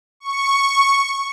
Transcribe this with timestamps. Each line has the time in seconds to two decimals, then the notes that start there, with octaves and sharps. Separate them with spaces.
0.20 C#6